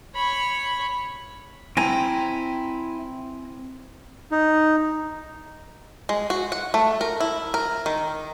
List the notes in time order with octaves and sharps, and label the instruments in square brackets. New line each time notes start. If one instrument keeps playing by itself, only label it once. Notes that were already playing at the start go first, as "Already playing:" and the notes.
[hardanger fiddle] C#5 B5
[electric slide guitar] C4 G#5 A#5 [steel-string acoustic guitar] E4 G5
[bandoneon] D#4
[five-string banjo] G#3
F#4
F#5
A3
A#4
E4
A#4
D#3